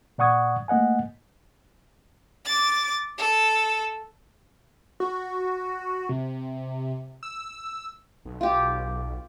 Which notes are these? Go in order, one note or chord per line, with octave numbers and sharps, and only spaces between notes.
A#2 D5 F#5 C#6 D#6 G#6
A3 A#3 D#5 F#5 G#5
D6 A6
A4
F#4
C3
E6
B1
F4 G4